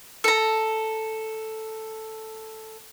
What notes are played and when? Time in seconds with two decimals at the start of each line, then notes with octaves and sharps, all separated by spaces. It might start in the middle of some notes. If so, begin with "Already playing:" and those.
0.24 A4 A#5